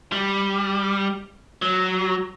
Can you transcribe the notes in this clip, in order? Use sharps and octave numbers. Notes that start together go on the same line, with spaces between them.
G3
F#3